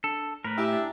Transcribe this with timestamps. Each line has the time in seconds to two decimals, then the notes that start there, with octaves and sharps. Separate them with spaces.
0.04 D4 A4
0.44 A2 A#4 B4 B5
0.58 E4 G4 E5 G#5 A#5
0.73 D4